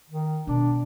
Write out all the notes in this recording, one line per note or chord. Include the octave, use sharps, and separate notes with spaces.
D#3
B2 D4